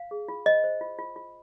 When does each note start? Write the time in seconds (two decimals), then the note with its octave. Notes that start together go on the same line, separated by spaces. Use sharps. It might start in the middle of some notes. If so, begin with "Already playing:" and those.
Already playing: F5
0.11 G#4
0.28 F4
0.46 C5 D#5
0.64 C5
0.81 F4
0.99 F4
1.16 F4